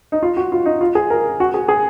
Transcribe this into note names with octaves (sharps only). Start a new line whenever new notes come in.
D#4
F4
F#4
F4
D#4
F4
G#4
A#4
F#4
G#4
G#4